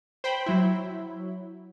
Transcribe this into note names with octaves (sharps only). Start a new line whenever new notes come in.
C5 G5 B5
F#3 E4